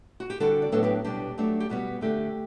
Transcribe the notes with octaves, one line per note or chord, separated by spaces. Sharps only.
F#4
G4
D3 G3 D4 F#4 A4
D5
A2 F#3 B3 D4 A4 C#5
G4 B4
B2 G3 D4 G4
F#3 A3 D4
G4
B2 G3 B3 F#4
D3 A3 D4 G4